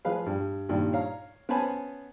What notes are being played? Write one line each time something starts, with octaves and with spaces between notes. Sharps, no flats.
F3 G#4 B4 F5
G2
G2 A#2 D#3
C#5 F5 A#5
B3 C#4 C5 G#5 A5 B5